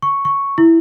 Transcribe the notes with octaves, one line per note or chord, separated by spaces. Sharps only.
C#6
C#6
E4